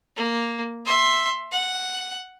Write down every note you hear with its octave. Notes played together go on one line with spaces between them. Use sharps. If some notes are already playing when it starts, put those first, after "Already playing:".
A#3
E5 C6
F#5